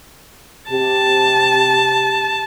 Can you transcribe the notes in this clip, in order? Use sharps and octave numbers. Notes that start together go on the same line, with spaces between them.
C3 G4 A5